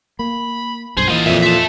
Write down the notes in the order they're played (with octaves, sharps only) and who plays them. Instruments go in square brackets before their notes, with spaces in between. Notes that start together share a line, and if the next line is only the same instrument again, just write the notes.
[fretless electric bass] A#3 [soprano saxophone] B5
[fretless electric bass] B1 G2 [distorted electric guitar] G#4 [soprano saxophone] C5
[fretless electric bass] E3 A#3 [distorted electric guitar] F4 D#5
[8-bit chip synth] F2 A#2 [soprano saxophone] E5
[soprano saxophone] F4 [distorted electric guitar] E5 A5